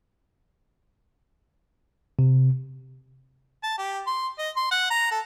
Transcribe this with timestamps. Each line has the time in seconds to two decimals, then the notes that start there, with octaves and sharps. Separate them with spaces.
2.19 C3
3.63 A5
3.78 G4
4.07 C6
4.39 D#5
4.56 C6
4.71 F#5
4.90 A#5
5.11 A4